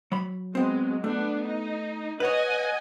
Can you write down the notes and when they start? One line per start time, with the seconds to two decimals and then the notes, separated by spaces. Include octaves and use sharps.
0.12 F#3 B5
0.55 F#3 G#3 B3 C4
1.04 A3 B3 D4
1.44 D#4
2.20 B4 C#5 D#5 F#5 G#5